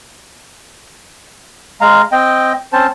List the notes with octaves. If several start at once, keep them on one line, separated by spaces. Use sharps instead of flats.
G#3 F5 A#5
C4 D#5 G5
C4 C#4 C5 A5